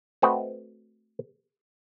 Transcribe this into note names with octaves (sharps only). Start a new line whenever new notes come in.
A3 C4 F#4 B4 D#5